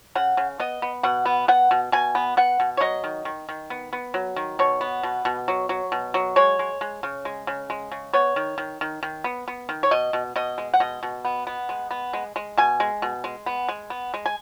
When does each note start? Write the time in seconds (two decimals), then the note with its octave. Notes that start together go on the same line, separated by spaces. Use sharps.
0.15 C#3 F#5
0.37 C#3
0.60 B3 D#5
0.82 B3
1.03 B2 F#5
1.26 B3
1.48 B3 F#5
1.71 B2
1.92 B2 G#5
2.15 B3
2.37 B3 F#5
2.60 B2
2.77 C#5
2.81 F#3 D#5
3.04 D#3
3.25 D#3
3.49 D#3
3.70 B3
3.93 B3
4.14 F#3
4.36 D#3
4.59 B2 C#5
4.81 B3
5.03 B2
5.25 B2
5.48 F#3
5.69 F#3
5.92 B2
6.14 F#3
6.36 G#3 C#5
6.59 G#3
6.81 G#3
7.03 C#3
7.25 G#3
7.47 C#3
7.70 G#3
7.92 C#3
8.13 B3 C#5
8.36 D#3
8.58 D#3
8.81 D#3
9.03 D#3
9.24 B3
9.48 B3
9.69 D#3
9.83 C#5
9.91 B2 D#5
10.13 B2
10.36 B2 D#5
10.58 G#3
10.74 F#5
10.80 B2 D#5
11.03 B2
11.25 B3
11.47 B3
11.69 G#3
11.91 B3
12.13 G#3
12.36 G#3
12.58 B2 G#5
12.80 G#3
13.02 B2
13.24 G#3
13.46 B3
13.69 G#3
13.90 B3
14.14 G#3
14.26 G#5